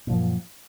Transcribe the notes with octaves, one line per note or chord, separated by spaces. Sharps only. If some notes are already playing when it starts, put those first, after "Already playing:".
F#2 A#2 F3